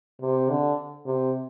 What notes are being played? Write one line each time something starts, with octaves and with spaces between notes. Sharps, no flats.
C3
D3
C3